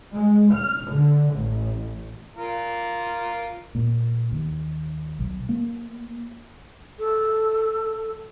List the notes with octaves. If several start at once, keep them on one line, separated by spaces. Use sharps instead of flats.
G#3
F6
D3
A1
F4 A#4
A#2
D#2
B1
A#3
A4